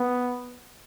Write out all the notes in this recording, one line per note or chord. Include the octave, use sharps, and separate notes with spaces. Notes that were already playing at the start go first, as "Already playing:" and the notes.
Already playing: B3